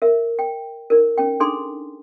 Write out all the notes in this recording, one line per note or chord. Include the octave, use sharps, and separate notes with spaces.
A#4 E5
G5
D#4 A#4
C#4 G5
D4 D#4 G#4 A4 G#5 C6